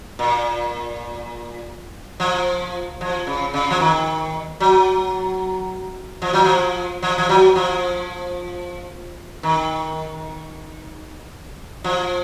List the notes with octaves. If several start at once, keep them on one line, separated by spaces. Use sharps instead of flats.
A#2
F3
F3
C#3
C#3
F3
D#3
F#3
F3
F#3
F3
F3
F3
F#3
F3
D#3
F3